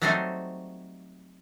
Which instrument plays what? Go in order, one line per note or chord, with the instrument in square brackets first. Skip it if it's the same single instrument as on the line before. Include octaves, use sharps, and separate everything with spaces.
[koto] F#3 G3 A3 C4 D#4 C5